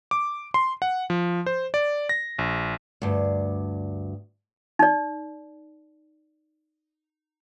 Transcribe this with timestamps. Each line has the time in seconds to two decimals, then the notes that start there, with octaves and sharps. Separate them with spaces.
0.11 D6
0.54 C6
0.82 F#5
1.10 F3
1.46 C5
1.74 D5
2.09 A#6
2.39 A#1
3.02 D2 G2
4.79 D#4 D5